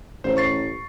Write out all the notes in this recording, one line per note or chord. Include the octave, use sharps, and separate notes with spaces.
A1 C5
C#6 A6 C7